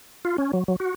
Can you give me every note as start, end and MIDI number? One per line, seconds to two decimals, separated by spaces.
0.25 0.37 65
0.38 0.52 61
0.53 0.64 54
0.68 0.76 54
0.80 0.94 66